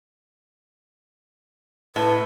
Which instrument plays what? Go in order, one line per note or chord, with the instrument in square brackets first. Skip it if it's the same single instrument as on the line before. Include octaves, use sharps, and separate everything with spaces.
[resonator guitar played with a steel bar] A2 [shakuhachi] B4